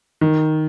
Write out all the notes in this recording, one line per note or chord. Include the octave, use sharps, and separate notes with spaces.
D#3